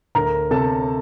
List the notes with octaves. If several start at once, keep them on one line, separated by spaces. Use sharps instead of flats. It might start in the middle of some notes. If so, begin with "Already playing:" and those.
D2 A#4 A#5
C3 A4 A5